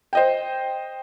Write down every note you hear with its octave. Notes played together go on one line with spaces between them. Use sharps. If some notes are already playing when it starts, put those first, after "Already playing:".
C5 D#5 G5